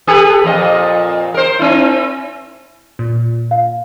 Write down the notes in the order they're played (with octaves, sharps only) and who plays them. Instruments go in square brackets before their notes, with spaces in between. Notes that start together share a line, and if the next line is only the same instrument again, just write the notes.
[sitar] G4 A4 B4
F2 A#2 D#5
A#4 C5
C4 E4
[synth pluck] A#2
[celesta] F5